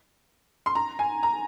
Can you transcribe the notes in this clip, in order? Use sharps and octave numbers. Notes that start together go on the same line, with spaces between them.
C6
A#5
G#5
A#5